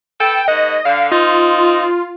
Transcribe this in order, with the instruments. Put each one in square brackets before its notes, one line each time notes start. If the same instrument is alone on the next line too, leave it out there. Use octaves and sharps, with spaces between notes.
[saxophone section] B3 A4 [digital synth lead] G5
[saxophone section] G#2 A#3 F#5 [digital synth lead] D#5
[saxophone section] D3 [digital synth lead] F5
[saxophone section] C4 D#4 [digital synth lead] F4